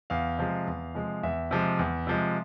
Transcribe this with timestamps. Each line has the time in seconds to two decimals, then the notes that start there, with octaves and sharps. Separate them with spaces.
0.10 E2 F5
0.39 C3 F3 G#3
0.67 E2
0.95 C3 F3 G#3
1.23 E2 E5
1.51 C3 F3 G#3
1.79 E2
2.07 C3 F3 G#3